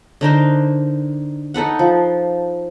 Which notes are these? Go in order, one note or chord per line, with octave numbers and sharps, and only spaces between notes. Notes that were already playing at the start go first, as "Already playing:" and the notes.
D3 D#4 A#4 C5
D#4 A4 B4 F#5
F3